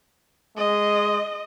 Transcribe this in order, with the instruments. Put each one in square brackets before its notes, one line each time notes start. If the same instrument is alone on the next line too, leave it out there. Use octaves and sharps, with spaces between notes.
[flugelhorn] G#3 [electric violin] D#5